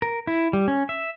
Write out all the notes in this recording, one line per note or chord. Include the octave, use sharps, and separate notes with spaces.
A#4
E4
G3
C#4
E5